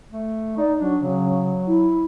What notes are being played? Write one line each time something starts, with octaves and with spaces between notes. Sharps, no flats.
A3
D#4 D5
F#3 D4
C#3 F#3
E4